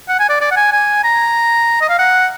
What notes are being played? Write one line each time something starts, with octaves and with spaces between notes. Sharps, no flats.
F#5
G#5
D5
D5
F#5
G#5
G#5
A#5
D#5
F5
F#5